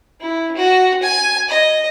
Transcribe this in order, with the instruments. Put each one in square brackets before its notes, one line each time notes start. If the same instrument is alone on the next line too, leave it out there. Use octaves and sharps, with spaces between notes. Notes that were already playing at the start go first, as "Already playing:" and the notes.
[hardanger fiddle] E4
F#4
G#5
D#5